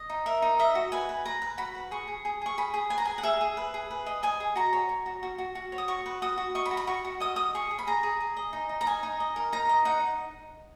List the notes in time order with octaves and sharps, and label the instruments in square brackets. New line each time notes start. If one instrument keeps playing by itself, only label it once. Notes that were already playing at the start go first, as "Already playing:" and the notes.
Already playing: [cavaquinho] D#5
D#4
A#4 E5
D#4
D#5 E5
F#4
B4 G#5
B4
B4 A#5
B4
F#4 B5
B4
G#4 C#6
G#4
G#4
G#4 C#6
G#4 B5
G#4
B4 G#5
A#5
G#4 G#5
F#5
G#4 E5
G#4
B4
G#4
B4
D#5
D#5 G#5
G#4
F#4 A#5
C#5
C#5
F#4
F#4
F#4
F#4
C#5
D#6
F#4 C#6
B4
F#4 D#6
F#4
D#5 C#6
B5
F#4
B5
F#4 C#6
F#4
D#5 D#6
D#5 D#6
G#4 C#6
G#4
B5
G#4 A#5
G#4
G#4
D#5
D#4
D#4
A#5
D#5 G#5
D#4
D#5
A#4
D#4 A#5
D#5
D#4 F#5